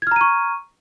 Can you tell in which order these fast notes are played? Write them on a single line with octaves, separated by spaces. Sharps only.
G#6 F6 A#5 D#7 C#6